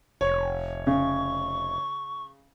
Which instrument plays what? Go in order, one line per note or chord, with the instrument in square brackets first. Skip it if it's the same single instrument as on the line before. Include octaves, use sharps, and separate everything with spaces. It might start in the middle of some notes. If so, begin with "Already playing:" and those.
[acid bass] F1 [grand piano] C#5
[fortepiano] C#3 [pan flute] C#6